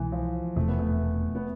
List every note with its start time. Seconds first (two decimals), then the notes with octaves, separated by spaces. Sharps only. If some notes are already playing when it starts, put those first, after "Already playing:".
Already playing: C2 B2 E3 G#3
0.12 F3
0.56 E1 E2 C3 A3
0.68 B3
0.79 A3
1.35 B3